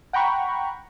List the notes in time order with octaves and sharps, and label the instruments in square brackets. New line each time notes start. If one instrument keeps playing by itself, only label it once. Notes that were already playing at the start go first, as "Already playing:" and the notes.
[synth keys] F#5 G5 A#5 B5 C#6